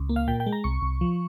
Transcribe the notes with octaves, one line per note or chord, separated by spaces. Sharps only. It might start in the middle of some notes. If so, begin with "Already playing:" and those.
Already playing: C#2
A#3
F5
A#2 G5
G5
G#3
A#5
C2 C#6
C2
F3